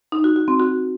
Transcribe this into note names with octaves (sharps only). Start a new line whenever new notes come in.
D#4
F#4
F#4
C4
F#4